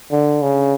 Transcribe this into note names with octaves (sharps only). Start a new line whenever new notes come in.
D3
C#3